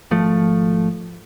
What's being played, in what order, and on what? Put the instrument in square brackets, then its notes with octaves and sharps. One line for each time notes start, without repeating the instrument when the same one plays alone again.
[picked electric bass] G#1 F3 A3